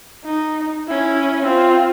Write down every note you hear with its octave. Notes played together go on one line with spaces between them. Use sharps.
D#4
C#4 E4
C4 F4